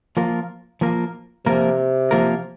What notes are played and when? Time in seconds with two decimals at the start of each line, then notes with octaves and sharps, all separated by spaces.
0.17 F3 A#3 F4 A#4
0.81 F3 A#3 F4 A#4
1.46 C3 F3 A#3 F4 A#4
2.11 F3 A#3 F4 A#4